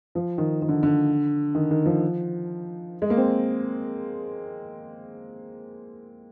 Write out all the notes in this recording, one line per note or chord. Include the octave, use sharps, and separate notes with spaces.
F3
D#3
D#3
D3
D3
D#3
D#3
F3
G#3
A#3
C4